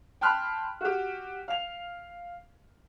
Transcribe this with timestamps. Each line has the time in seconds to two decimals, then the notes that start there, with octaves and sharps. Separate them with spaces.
0.21 G5 A5 B5 C6 F6 F#6
0.81 F#4 G4
1.48 F5 F7